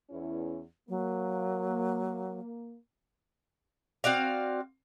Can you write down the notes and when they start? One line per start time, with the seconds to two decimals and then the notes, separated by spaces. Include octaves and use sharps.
0.10 E2 C#4 E4
0.89 F#3 A#3
4.04 C4 F#4 D5 F5